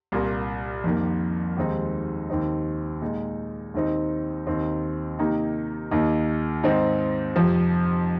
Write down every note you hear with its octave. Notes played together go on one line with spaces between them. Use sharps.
C2 A#2 A#3
F2 D#3 A#3
D#2 D#3 G#3 C4 D#4
D#2 D#3 C4 D#4
A#2 G#3 D#4
D#2 D#3 C4 D#4
D#2 D#3 C4 D#4
C3 D#3 A#3 D#4
D#2 D#3 A#3 D#4
G#2 D#3 C4 D#4
F2 C3 F3